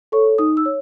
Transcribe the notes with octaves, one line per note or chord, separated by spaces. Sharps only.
A4 C#5 C#6
D#4 D#6
E6
C#5